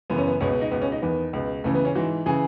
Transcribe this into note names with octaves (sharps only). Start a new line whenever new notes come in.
F#2 C#3 E3 B3
C#4
B3
C#2 B2 C#4
B3
D#4
C#2 B2 B3
C#4
D#4
E2 D#3 B3
C#2 B2
C#2 C#3 E3 A3
B3
C#4
G#2 E3 F#4
C#3 E3 G#4